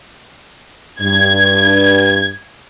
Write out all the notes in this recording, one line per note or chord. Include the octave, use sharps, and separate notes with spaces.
G2 G#6